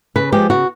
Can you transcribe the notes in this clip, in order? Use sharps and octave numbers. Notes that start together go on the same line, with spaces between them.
C#3 B4
F3 G#3 G4
C#3 F#4